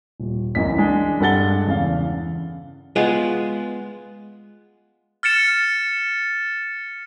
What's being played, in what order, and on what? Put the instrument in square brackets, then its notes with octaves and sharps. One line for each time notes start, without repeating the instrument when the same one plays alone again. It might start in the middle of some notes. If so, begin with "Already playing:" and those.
[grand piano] D#1
C#2 F#2 C#3 E3 D#5 B6
G#3 D4 D#5
G2 G#3 A4 F#5 A6 G7
E2 C#3 F5
[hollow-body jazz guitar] G#3 B3 F4 G#4
[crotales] F6 A6 C#7 E7